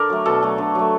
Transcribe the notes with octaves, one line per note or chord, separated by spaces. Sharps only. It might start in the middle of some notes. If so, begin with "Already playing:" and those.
Already playing: D3 A#4 D5
F#3 A3
B2 A4
F#3 A3
D3
F#3 A3